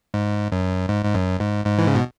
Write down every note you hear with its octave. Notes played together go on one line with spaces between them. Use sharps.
G#2
F#2
G#2
G#2
F#2
G#2
G#2
E3
C#3
B2